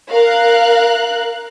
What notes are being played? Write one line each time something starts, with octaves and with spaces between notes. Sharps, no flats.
A#4 F5 F#6